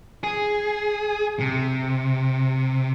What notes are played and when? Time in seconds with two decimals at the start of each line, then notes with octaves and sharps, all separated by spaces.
0.23 G#4
1.40 C3